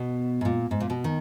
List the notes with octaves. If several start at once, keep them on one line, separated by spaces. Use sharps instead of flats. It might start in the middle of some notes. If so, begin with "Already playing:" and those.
Already playing: B2
G#2
A#2
G#2
A#2
B2
D#3